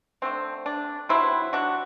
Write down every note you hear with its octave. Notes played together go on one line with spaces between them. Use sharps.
D3 A3 C4
D4
C3 F#3 B3 C4 E4
D4 F#4